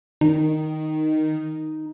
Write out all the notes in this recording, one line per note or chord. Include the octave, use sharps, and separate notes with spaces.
D#3 D#4